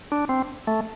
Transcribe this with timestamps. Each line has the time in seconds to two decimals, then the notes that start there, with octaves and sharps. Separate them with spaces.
0.12 D4
0.29 C4
0.67 A3